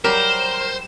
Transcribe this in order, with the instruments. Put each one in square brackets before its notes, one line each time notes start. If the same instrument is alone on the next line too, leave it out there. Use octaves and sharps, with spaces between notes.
[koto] F#3 G3 G4 [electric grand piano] A#4 [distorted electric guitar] C5 [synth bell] E7